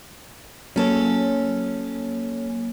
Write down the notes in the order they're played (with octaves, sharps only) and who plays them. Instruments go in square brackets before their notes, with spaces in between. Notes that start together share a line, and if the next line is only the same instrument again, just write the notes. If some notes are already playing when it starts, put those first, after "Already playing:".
[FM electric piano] F#3 A#3 C#5 [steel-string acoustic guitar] C#4 A4